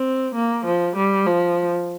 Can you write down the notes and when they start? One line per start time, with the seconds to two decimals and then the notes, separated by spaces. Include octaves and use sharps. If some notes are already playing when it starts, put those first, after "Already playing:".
Already playing: C4
0.35 A#3
0.65 F3
0.96 G3
1.26 F3